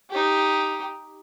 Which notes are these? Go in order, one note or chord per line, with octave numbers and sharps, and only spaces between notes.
D#4 G4